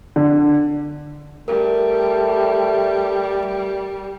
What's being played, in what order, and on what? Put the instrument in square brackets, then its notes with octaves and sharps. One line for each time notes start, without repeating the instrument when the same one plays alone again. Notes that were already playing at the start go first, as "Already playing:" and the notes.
[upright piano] D3
[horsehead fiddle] G3 [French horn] A3 [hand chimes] A#4